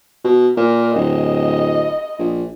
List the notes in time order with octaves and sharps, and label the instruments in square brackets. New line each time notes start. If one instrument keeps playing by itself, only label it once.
[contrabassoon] B2
[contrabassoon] A#2 [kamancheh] A#4
[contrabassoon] D1 [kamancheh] D#5
[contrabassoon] A#1